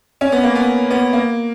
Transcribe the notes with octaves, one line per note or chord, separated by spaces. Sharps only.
C#4
B3
A#3
B3
B3
A#3